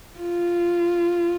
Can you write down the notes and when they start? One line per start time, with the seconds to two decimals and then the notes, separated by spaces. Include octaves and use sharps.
0.19 F4